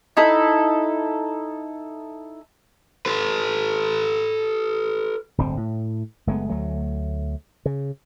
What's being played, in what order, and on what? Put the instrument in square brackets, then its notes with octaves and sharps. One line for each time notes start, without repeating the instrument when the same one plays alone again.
[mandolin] D#4 E4 A4
[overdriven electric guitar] A4 B4
[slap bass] D1 G1 D3 C4
A2
F#1 G#3 A3 B3
D2 F#3 A3
C#3